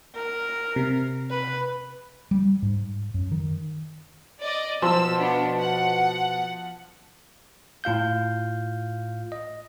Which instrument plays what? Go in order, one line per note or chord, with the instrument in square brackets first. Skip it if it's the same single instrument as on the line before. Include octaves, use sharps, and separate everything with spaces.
[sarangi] A#4
[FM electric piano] C3
[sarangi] B4
[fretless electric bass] G3
G#2
F#2
D#3
[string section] D5 D#5
[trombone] B2 [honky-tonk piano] F3 A5 C6 [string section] E6
[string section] B3 D4
F#5
[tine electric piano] A2 F4 F5 G6
D#5